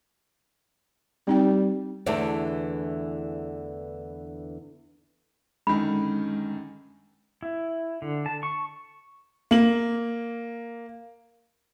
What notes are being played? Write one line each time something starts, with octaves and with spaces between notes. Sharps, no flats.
G3 C4 D#4 G5
E2 D3 E3 A3 D4
F#2 D3 D#3 G#3 B5
E4
D3
A5
C#6
A#3 F#7